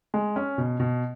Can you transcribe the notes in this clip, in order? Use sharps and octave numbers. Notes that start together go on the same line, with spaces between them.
G#3
C#4
B2
B2